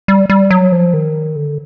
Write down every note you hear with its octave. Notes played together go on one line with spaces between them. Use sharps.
G3
G3
F#3
F3
D#3
D3